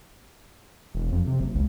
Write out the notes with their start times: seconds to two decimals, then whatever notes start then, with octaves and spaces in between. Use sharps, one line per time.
0.95 E1
1.12 F2
1.27 C3
1.40 F#1
1.55 C#2